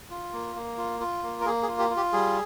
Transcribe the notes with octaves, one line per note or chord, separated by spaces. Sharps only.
F4
A#3
A#3
F4
F4
A#3
A#4
A#3 G#4
G#4
F4
G4
F4
G4
G3 G#4